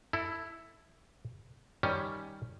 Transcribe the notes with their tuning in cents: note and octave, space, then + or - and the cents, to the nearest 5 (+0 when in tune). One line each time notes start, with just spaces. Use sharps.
E4 +0 A4 +20
D#3 +0 G3 +0 C#4 +0